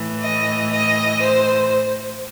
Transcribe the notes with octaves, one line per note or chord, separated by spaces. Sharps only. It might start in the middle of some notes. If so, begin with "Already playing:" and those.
Already playing: A2 E3
D#5
D#5
C5